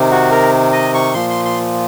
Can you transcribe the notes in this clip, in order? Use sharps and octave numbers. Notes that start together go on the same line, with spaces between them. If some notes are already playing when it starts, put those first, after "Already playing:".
Already playing: C3 D#3
F#4
A#4
D#5
C#6
A#2 F3 C6
C6
C6